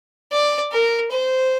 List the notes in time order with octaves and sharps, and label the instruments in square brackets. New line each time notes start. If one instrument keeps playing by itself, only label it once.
[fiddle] D5
A#4
C5